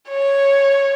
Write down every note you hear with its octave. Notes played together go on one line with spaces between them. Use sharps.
C#5